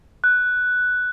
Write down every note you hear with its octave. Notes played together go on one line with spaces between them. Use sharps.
F#6